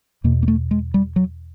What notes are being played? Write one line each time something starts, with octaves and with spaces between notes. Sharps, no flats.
E2 B2 A#3
A#3
A3
G#3
G3
F#3